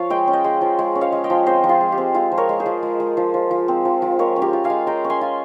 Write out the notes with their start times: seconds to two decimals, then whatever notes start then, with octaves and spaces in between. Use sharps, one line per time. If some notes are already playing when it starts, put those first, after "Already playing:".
Already playing: F3 F4 C#5 F5
0.10 G#3 D#5 G5
0.28 C#4
0.33 D#5 G5
0.44 G#3
0.61 F3
0.79 G#3
0.95 C#4
1.01 C#5 F5
1.12 G#3
1.24 D#5 G5
1.30 F3
1.46 C4 C5 D#5
1.64 F3
1.69 F4 G#4
1.81 G#3
1.92 G4
1.98 C4
2.14 G#3 F4
2.32 F3
2.37 A#4 C#5
2.49 G#3
2.60 G#4 C5
2.66 F3
2.83 G#3
3.00 G#3
3.17 F3
3.34 F3
3.51 F3
3.68 C4
3.85 F3
4.02 F3
4.19 G#3 A#4 C#5
4.36 C#4
4.42 G4 A#4
4.53 F4
4.64 F5 G#5
4.70 G#3
4.87 G#3 G5 A#5
5.04 C#4
5.10 G#5 C6
5.21 F4